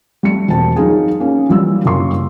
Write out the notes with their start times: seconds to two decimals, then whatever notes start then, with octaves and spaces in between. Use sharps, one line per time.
0.23 G3 A3 C#7
0.48 E1 C4 A5
0.76 F#3 D#4 F4 G#4
1.20 A#3 C#4
1.49 E3 F#3 G3 F4 E6
1.85 F#1 F#2 A#3 C6 C#6